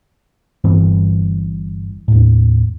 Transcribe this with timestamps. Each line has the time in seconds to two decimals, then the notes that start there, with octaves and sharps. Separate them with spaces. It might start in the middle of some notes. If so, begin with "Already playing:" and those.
0.64 G1 G2 E3 C4
2.08 D#2 A2